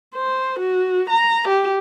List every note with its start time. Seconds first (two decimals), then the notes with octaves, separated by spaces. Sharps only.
0.16 C5
0.60 F#4
1.10 A#5
1.48 G4